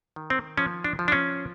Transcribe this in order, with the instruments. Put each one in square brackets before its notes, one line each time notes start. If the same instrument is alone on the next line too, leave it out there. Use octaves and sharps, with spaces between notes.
[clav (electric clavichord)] D#3
C4
F3 C#4
D4
F3
D4
C#4